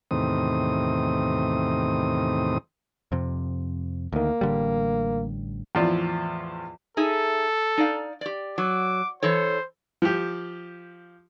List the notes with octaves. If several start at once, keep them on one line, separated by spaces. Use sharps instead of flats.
E2 A2 C3 D#3 C4 D#6
F2 C3
D2 D#3 A#3
A1 D3 G3
E2 A2 F3 F4 D5
D#4 G#4 A4 E5
D#4 D5 F5
G4 D5
F#3 D6
E3 A4 C5 C#5
F3 G4